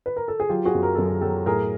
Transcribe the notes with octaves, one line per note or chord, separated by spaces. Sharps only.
B4
A#4
A4
G#4
F#3 F4 G4
F#4 G#4
F#2
A#4
F#2 A4
G#4
F#3 G4 A4
A2 G#4 A#4